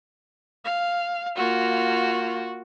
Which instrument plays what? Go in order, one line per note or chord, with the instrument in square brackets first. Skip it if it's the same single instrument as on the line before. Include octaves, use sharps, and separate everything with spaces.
[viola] F5
[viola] A#3 F4 [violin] F#4